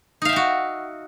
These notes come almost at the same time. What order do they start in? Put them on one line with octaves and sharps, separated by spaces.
D#4 F5 E5 G5 F#4